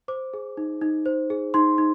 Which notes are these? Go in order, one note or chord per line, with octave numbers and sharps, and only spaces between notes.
C5 D6
G#4
D#4
D#4
C5
G#4
D#4 C6
D#4